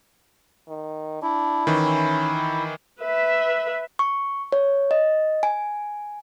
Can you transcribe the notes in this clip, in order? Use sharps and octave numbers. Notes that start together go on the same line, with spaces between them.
D#3
D4 E4
D#3 E3 C#4
B4 E5
C#6
C#5
D#5
G#5